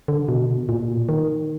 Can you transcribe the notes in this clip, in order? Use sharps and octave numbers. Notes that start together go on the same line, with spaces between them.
D3
B2
A#2
D#3